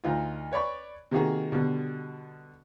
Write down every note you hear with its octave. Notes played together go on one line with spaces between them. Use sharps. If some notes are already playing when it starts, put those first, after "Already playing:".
D2 D#4 F4
B4 C#5 D5 B5 C#6
C3 D#3 A#3 D#4 F#4 G#4
B2 D3 G3